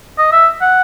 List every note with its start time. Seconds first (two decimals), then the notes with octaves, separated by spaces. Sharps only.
0.18 D#5
0.32 E5
0.61 F#5